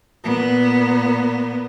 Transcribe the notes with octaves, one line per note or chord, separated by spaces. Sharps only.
A#2 B3